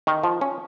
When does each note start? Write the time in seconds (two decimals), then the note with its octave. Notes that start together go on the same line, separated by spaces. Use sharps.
0.07 D#3
0.23 F3
0.41 C#4